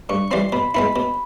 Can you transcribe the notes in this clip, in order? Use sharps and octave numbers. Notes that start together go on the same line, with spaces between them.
G2 C#6
E3 G3 C4 C6
B2 B5
G#3 B3 E4 B5
B2